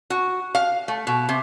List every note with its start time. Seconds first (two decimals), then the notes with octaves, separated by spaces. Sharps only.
0.10 F#4
0.55 F5
0.88 A3
1.07 B2
1.29 C3